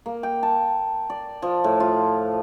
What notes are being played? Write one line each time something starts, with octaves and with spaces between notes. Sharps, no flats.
A#3
G5
A5
D5
F3
A2
F4